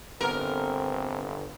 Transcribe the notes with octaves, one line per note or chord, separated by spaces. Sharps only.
G1 D3 B3 C4 A#4